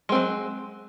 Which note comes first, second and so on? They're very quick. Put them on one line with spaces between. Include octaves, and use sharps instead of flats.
G#3 C4 F#3